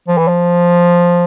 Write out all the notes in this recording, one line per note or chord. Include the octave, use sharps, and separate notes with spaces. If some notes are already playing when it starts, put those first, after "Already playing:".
F3
E3
F3